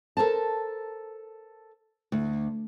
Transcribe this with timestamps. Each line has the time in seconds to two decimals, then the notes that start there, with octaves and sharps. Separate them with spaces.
0.17 A4 A#4 C5 A5
2.12 D2